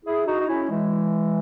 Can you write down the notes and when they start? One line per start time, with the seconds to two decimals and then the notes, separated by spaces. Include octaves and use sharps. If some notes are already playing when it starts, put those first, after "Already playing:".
0.04 E4 G#4
0.26 D#4 F#4
0.39 D#4
0.47 C#4 E4
0.69 E3 G#3